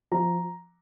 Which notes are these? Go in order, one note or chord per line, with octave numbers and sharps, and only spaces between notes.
F3 A#5